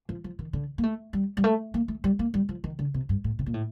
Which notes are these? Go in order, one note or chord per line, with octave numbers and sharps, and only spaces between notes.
F3
F3
D#3
D3
A#3
A3
G3
G3
A3
A#3
A3
G3
A#3
G3
F3
D#3
D3
C3
G2
A2
C3
A#2
A2